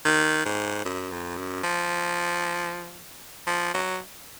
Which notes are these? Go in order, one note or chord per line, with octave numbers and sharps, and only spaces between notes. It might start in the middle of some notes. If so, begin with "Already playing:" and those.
D#3
G#2
F#2
F2
F#2
F3
F3
F#3